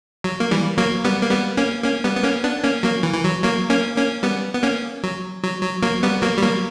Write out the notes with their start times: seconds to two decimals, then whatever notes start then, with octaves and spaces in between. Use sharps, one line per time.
0.24 F#3
0.40 A#3
0.51 E3 G3
0.78 F#3 A#3
1.04 G3 B3
1.22 A#3
1.30 G3 B3
1.57 A#3 C#4
1.84 A#3 C#4
2.04 G3 B3
2.16 B3
2.23 A#3 C#4
2.44 B3 D4
2.63 A#3 C#4
2.83 F#3 A#3
3.03 E3
3.14 E3
3.24 F#3
3.44 F#3 A#3
3.70 A#3 C#4
3.96 A#3 C#4
4.23 G3 B3
4.54 B3
4.63 A#3 C#4
5.04 F#3
5.44 F#3
5.63 F#3
5.83 F#3 A#3
6.03 G3 B3
6.22 F#3 A#3
6.38 G3
6.43 F#3 A#3